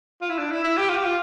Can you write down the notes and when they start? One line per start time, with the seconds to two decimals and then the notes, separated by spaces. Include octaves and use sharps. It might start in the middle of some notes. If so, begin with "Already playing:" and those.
0.22 F4
0.30 E4
0.38 D4
0.52 E4
0.64 E4
0.77 G4
0.89 F4
0.97 G4
1.04 F4